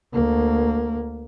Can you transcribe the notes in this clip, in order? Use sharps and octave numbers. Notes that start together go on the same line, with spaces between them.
D2 A#3